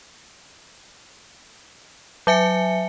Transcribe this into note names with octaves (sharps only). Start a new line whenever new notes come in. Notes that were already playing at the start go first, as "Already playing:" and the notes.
F#3 E5 G#5 C#7